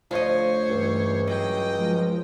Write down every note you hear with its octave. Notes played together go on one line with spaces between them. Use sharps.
D2 F3 C5 C#5 D#5
C#2 G2 E3
F#3 D#5 G5
F3 G#3